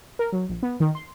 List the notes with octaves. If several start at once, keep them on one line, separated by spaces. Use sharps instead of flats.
A#4
F#3
A#1
B3
D#3
C6